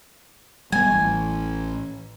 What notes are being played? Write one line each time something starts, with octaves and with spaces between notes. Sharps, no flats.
G3 B3 G#5
A1